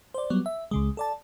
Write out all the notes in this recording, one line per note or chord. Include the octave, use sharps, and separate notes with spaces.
C5 D5
F#3 G3 B3
E5
C#2 C#3 G#3
A4 D5 A5